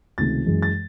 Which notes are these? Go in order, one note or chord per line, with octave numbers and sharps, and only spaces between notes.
C#2 C3 D#3 A3 A6
F#2 E3 G#3
A6